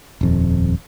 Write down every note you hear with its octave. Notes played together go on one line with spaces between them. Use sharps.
D#1 F2